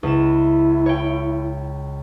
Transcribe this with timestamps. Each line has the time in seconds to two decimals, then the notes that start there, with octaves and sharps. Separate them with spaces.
0.03 C#2 E4 E7
0.86 C#5 G5